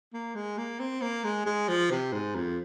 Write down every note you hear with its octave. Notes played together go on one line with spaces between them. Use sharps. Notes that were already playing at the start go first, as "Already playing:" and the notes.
A#3
G#3
A#3
C4
A#3
G#3
G#3
F3
C3
G#2
F2